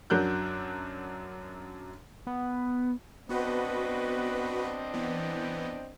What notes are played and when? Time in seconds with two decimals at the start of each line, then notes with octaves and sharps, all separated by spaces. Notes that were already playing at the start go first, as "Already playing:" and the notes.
0.10 F#2 F#3 D4 A#4 F#6 G6
2.27 B3
3.29 B3 C4 D4 F#4 B4 D#5
4.93 E3 B3